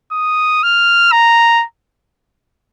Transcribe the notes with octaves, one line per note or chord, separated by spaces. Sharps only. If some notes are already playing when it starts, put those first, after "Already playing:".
D#6
F6
A#5